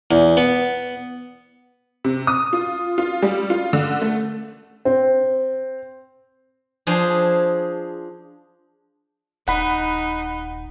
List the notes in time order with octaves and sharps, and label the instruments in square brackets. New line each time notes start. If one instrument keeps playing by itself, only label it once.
[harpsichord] E2
B3
[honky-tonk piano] C3
D#6
F4
F4
G3
F4
D3
A3
[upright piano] C4
[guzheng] F3 D4 G#4 C5 G#5
[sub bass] D#1 [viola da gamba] D#4 [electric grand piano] F#5 B5